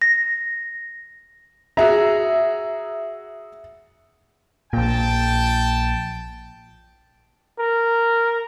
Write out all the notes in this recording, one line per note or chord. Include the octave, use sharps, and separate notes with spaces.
A#6
F#4 G#4 E5 A#5
A#1 A#2 G5 A5
A#4